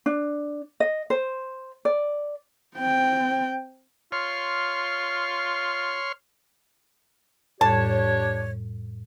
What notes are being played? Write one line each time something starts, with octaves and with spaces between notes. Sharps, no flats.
D4
D#5
C5
D5
C4 G5
F4 C#5 C6 F6
F2 A2 G3 D4 G4 C#5 A5